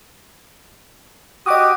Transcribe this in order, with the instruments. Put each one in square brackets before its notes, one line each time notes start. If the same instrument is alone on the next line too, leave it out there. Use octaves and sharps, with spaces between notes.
[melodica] F#4 G4 [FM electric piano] D#5 D6 D#6